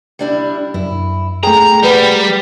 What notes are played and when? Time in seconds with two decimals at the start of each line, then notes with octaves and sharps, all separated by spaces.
0.19 G3 D4 E4
0.74 F#2 E4
1.43 A3 G#4 G5 A#5
1.83 G3 G4 B4 F#5